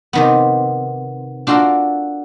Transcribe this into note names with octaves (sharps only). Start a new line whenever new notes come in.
C3 D#3 B3
D4 F4 F#4 A4 A#4